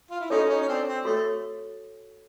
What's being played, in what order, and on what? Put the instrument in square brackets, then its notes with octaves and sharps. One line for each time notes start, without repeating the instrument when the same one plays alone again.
[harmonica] F4
E4
[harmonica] C#4 D#4 [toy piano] F#4 A4 C#5
[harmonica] C#4 D#4
C#4
C4 D4
C4
[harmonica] A3 [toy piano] F#4 A4 C#5